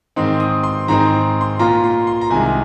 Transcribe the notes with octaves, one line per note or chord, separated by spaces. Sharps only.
G#2 D#3 C4 D#4 C6
D#6
C6
G#2 D#3 C4 D#4 A#5
C6
C6
A#2 A#3 F4 A#5
C6
C6
A#5
C2 C3 D#3 G#3 G#5